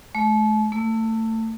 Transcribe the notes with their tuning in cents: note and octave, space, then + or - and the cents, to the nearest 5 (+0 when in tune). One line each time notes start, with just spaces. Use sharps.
A3 -40
A3 +25